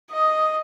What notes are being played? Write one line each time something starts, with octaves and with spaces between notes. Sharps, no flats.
D#5